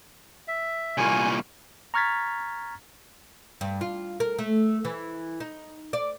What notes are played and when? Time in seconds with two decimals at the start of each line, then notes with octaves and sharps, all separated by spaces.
0.48 E5
0.98 C2 A#2 A#3 G#5 C#6
1.94 A#5 C#6 F6 G#6 A6 B6
3.61 G2
3.81 F4
4.20 A#4
4.39 A3
4.85 E3
5.40 D#4
5.93 D5